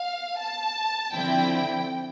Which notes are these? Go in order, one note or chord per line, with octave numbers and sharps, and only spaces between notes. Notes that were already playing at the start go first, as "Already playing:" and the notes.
Already playing: F5
A5
D3 F3 C4 E4 G5